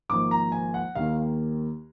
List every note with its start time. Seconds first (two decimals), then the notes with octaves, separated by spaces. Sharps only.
0.09 G#1 G#2 F3 A#3 D6
0.31 A#5
0.52 G#5
0.74 F#5
0.95 D#2 D#3 A#3 F5